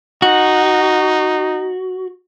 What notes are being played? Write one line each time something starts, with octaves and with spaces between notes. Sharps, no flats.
D#4 F#4